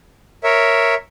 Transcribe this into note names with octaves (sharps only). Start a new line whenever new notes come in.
A#4 C#5 E5